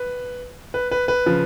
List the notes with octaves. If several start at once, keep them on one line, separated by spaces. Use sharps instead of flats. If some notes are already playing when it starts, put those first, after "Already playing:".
Already playing: B4
B4
B4
B4
C#3 F3